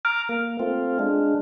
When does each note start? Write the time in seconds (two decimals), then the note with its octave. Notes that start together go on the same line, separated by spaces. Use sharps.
0.05 A#5 D6 F6
0.29 A#3
0.60 A3 C4 F4
0.99 G#3 D4